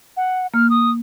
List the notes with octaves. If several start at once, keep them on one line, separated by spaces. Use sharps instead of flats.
F#5
A#3 F6
D#6